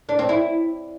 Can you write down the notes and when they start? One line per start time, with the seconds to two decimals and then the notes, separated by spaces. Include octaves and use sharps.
0.09 D4
0.19 C4
0.29 E4